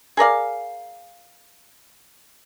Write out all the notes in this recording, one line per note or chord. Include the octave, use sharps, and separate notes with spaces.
G#4 A#4 D5 F5